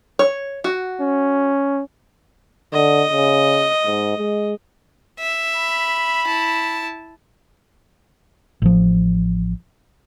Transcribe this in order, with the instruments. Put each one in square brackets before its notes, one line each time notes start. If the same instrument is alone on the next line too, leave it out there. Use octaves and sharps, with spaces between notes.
[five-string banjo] C#5
F#4
[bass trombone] C#4
[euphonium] D3 [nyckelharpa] D#5
[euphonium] C#3
G#2
G#3
[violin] E5
[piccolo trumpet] B5
[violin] E4 A5
[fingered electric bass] A1 F3